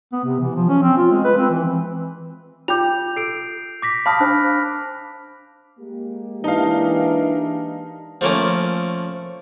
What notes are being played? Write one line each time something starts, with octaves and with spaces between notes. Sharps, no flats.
B3
C3
E3
F3
C#4
C4
F4
G#3
B4
C4
E3
F4 G5 D6 G6 F7
A4 E6 C7 D7
D6 A#6 B6
F5 A5 B5 D#6 F6
D4 A#4 C5 F#6
G#3 A#3 G4
E3 D4 D#4 F5
F3 A3 A#3 C#4